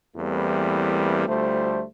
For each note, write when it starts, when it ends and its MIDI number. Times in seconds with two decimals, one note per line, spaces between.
0.17 1.28 40
0.17 1.28 52
0.17 1.28 55
0.17 1.28 57
0.17 1.28 58
0.17 1.28 60
1.28 1.83 38
1.28 1.83 55
1.28 1.83 57
1.28 1.83 65
1.28 1.83 72